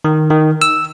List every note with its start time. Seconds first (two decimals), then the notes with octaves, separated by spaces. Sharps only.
0.05 D#3
0.30 D#3
0.62 E6